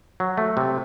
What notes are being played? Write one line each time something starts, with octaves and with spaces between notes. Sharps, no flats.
F#3
A3
C3